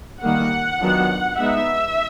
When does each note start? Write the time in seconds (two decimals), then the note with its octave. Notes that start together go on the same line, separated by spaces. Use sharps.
0.22 D#3 G3 A#3 F#5
0.80 D#3 F#3 B3 D4 F4
1.38 G#3 B3 D#4 E5